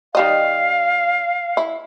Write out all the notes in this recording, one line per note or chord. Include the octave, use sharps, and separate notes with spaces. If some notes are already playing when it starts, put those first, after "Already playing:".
D#3 G3 D#5 F5
E4